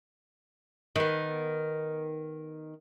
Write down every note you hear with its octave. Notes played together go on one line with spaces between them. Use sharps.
D#3 B3